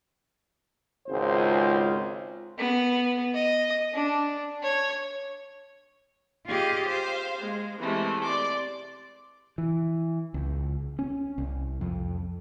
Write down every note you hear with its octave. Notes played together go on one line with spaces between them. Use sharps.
G#1 C#2 F4 C5
B3
D#5
D4
C#5
F4 G4 G#4 D#5 F5
C5 F5
G#3
C3 E3 G#3 A3
D5 C6 D6
E3
C#2
C#4
C2
F2